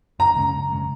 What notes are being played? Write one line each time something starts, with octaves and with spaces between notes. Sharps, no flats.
F#2 A#5
C#3 G#3 C#4
F#2
C#3 G#3 C#4